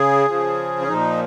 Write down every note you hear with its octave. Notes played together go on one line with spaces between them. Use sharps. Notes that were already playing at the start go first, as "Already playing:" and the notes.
Already playing: C#3 G#4
C#3 F3
C#4
A#2 F3 D#4